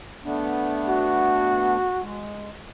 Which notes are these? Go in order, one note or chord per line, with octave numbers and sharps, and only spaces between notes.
A3 B3 D4
F#4
G#3